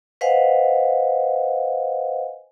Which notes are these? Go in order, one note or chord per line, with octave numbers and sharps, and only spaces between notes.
B4 C5 D#5 F5 F#5 G#5